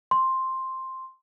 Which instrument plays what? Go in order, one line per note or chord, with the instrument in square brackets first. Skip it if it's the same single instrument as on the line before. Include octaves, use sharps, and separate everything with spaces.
[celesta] C6